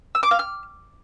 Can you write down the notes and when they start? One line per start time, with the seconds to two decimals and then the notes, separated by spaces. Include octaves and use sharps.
0.15 E6
0.23 D6
0.31 F5
0.39 F6